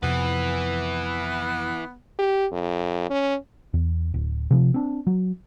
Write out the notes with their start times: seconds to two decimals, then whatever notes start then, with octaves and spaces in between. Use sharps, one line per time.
0.03 F2 C3 B3 E4 B4
2.19 G4
2.52 F2
3.10 C#4
3.74 E2
4.14 D1
4.51 C3 F3
4.74 C4 D4
5.07 F#3